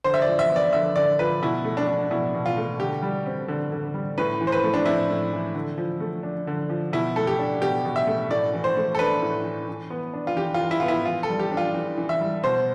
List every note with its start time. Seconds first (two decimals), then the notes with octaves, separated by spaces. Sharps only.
0.04 D3 C5
0.14 E5
0.22 D5
0.27 F3
0.39 E5
0.50 B3
0.56 D5
0.73 D3 E5
0.96 D3 D5
1.19 F3 B4
1.42 B2 E4
1.64 A3
1.77 D4
1.87 D4
2.11 B2 E4
2.34 B2
2.46 F4
2.57 A3
2.79 D3 G4
3.02 G3
3.26 C4
3.48 D3
3.72 D3
3.94 G3
4.18 A2 B4
4.41 E3
4.47 C5
4.52 B4
4.64 A3
4.74 D4
4.86 C4 E4
5.09 A2
5.33 E3
5.54 D3
5.78 F3
6.00 A3
6.23 D4
6.47 D3
6.70 F3
6.93 B2 E4
7.16 A3 A4
7.27 G4
7.39 D4
7.61 B2 G4
7.85 B2
7.96 E5
8.07 A3
8.30 A2 D5
8.54 E3
8.64 C5
8.77 A3
8.95 A4
8.99 D4 B4
9.22 A2
9.44 E3
9.68 E3
9.90 B3
10.13 D4
10.27 F4
10.36 E3 G4
10.54 F4
10.60 E3
10.71 E4
10.80 B3 F4
10.88 E4
11.05 E3 F4
11.23 A4
11.29 G3
11.40 G4
11.52 D4
11.57 F4
11.74 E3
11.97 E3
12.09 E5
12.21 G3
12.44 B2 C5